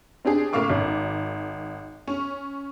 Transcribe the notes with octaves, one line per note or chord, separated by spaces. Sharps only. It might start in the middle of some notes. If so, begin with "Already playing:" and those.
C4 D4 G4 G#4
A2 C#3 A#3 F5 C#6 D6
G#1
C#4